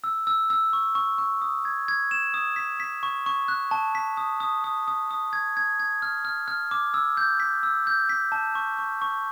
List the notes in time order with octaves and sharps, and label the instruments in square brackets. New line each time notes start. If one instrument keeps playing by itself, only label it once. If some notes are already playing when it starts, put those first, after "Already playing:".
[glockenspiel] E6
E6
E6
C#6
C#6
C#6
D#6
G#6
G#6
E7
D#6
B6
B6
C#6
C#6
F#6
A5
B6
D#6
D#6
D#6
D#6
D#6
G#6
G#6
G#6
F6
F6
F6
D6
E6
G6
B6
E6
G6
B6
A5
C#6
C#6
C#6